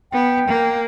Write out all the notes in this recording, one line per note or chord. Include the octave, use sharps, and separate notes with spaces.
B3 G5
A#3